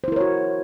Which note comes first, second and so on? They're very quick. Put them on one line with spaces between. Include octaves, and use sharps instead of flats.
C5 E4 A#4 C#5 F#4